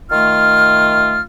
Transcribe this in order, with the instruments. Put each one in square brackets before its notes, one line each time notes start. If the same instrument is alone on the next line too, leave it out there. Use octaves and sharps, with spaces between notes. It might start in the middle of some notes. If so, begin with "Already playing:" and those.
[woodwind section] D#3 A3 F4 F6